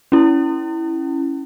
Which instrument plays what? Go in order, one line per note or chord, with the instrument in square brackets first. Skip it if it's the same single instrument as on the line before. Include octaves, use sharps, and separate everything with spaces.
[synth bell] C#4 E4